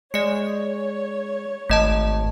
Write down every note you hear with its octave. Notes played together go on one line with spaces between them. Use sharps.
G#3 C#5 D5 C#7
G#1 A3 D#5 A5